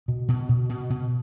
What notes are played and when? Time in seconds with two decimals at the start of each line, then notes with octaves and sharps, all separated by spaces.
0.08 B2
0.29 B2
0.49 B2
0.69 B2
0.90 B2